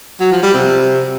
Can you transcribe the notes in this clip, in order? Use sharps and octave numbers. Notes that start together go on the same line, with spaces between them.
F#3
F3
G3
C3